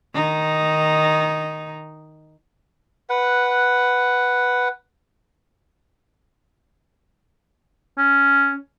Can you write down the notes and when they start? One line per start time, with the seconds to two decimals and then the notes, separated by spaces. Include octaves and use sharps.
0.14 D#3 D#4
3.09 B4 F#5
7.98 C#4